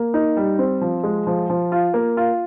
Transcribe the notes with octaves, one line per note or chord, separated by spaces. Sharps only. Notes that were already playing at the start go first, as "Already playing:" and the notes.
Already playing: A#3
D#4
G3
C4
F3
G#3
F3
F3
F4
A#3
F4